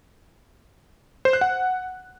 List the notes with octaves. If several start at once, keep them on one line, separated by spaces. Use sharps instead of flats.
C5
F#6
F#5